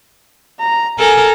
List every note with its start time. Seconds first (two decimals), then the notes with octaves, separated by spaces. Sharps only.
0.60 A#5
0.99 A4 A#4 G#5